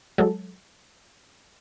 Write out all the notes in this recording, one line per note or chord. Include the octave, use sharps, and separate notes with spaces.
F#3 G#3 A4